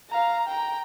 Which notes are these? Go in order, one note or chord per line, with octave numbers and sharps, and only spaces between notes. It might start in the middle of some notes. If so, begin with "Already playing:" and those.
F5 A#5
G5 A#5